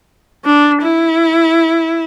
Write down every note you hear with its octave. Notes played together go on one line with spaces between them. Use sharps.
D4
E4